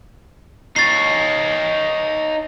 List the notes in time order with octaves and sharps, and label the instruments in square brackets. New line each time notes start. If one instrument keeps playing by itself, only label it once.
[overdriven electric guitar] D#4 C#5 [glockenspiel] A6 C7